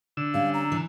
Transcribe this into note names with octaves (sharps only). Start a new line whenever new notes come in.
D3 E6
G3 C#4 F5
A#5
E3